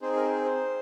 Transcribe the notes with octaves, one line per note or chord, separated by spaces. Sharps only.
C4 D#4 G#4 C5
A#4
C5
C5